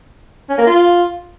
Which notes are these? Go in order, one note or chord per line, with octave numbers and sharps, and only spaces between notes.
C#4
A#3
F4